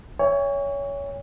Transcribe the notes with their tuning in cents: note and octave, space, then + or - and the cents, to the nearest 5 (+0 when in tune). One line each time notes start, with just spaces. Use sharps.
C#5 +20 E5 +0 G#5 -45